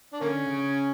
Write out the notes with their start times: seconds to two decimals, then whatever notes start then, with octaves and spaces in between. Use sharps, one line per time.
0.13 D4
0.21 D3 A#3 C#4
0.49 C#3